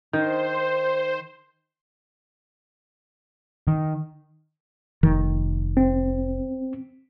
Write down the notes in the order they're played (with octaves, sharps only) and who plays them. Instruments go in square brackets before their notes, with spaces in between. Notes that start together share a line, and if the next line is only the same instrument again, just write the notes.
[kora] D#3 [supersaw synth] C5
[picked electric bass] D#3
[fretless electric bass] F1 D#3
[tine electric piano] C4